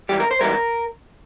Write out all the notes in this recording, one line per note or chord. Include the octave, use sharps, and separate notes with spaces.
G#2 E3 G3 G4
A#4
C5
G#2 E3 G3 A#4